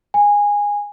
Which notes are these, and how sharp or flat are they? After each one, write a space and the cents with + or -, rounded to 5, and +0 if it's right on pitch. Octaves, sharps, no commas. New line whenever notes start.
G#5 -15